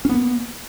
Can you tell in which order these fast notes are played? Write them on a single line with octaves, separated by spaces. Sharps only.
C#4 B3 A#3